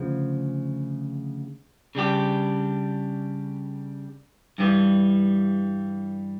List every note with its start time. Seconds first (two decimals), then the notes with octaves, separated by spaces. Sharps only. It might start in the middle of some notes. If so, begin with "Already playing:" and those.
Already playing: D2 C#3 F3
1.95 C#3 G3 D4 G4
4.58 G2 E3 G3